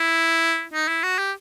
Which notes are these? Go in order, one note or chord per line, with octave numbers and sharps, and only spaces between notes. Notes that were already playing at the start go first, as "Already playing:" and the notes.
Already playing: E4
D#4
E4
F#4
G4